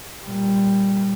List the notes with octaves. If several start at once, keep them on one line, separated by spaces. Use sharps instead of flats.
A#2 G3